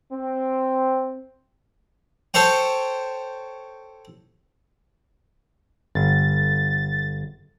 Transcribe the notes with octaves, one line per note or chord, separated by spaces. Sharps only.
C4
A4 C5 C#5 G5
G1 A6